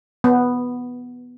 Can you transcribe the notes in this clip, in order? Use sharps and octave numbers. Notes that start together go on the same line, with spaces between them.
B3